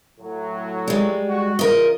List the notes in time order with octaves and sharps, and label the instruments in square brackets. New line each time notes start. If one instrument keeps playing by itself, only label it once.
[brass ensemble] A2 F#3
[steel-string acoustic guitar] G3 G#3
[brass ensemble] F#4
[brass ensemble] C#3 E3 F4 [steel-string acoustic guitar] A#4 D#5